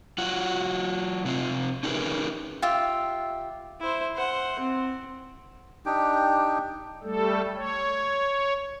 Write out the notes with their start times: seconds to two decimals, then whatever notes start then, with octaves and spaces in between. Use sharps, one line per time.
0.18 F#3 F4 F#4 F#5
1.25 C3 C4 F4
1.83 C#4 D#4 G4 G#4 A#4 B4
2.62 F4 G4 E5
3.81 E4 C5
4.16 C5 F#5
4.59 C4
5.86 D4 D#4 G4 G5
7.03 G3 A3 A4
7.55 C#5